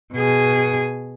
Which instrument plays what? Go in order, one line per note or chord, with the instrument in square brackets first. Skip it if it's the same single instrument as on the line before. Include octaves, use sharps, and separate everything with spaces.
[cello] B2 G#4